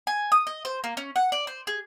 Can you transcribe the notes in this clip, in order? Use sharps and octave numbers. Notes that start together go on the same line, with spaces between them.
G#5
D#6
D#5
C5
A#3
C#4
F#5
D5
C5
G#4